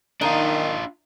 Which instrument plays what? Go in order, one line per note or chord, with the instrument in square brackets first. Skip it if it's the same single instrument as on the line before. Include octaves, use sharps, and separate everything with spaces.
[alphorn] D#3 [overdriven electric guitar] D4 F4 [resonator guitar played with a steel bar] D#4